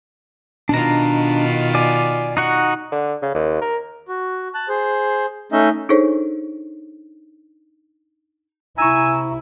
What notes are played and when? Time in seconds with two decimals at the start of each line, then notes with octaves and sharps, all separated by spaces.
0.69 B2 D#3 D4 F4 A#5
1.75 D5 G#5
2.37 D#4 F#4 F#5
2.91 D3
3.22 C#3
3.35 D#2
3.61 A#4
4.08 F#4
4.54 A5 F#6
4.69 G#4 C5
5.52 A3 C#4 D#4 D#5 E5
5.89 D4 D#4 G#4 A4 C5 C#5
8.78 C3 E4 G#5 A#5 C#6 E6